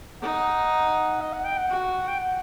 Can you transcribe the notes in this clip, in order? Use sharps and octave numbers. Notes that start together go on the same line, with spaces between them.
D#4 F#5
D#5
F#5
G5
F#5
F#4
G5
F#5